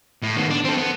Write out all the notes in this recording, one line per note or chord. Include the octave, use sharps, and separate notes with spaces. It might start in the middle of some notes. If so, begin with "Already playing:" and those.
A2
D#3 B3
D4
C4 A4
B3